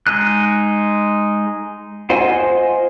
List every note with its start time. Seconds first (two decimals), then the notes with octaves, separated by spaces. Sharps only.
0.07 G#3 D#4 F#6
2.10 F4 C5 D#5 F#5 G#5